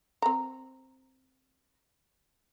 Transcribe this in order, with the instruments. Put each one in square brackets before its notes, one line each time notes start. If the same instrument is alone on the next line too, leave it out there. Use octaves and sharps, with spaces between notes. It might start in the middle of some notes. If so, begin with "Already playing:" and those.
[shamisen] C4 A#5